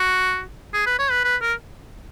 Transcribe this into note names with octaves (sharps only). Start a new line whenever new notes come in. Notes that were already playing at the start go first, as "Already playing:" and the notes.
Already playing: F#4
G#4
B4
C#5
B4
B4
A#4